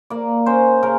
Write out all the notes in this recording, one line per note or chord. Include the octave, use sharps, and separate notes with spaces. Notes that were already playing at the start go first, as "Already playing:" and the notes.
A#3 D5
C#4 C5
C#3 A#4